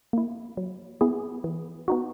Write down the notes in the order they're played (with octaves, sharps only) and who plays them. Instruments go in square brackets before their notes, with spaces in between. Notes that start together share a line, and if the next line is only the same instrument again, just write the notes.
[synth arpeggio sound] A#3 E4
F#3
B3 E4 G#4
E3
B3 D#4 F#4